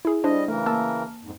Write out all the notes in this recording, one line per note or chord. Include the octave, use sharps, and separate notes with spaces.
E4 G#4
G3 D4 E4 C5 D#5
C#3 E3 A3 A#4
A#3 A5 E6
F2 G#2